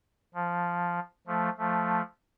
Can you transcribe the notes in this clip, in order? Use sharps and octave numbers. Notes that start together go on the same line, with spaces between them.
F3
F3 A3
F3 A3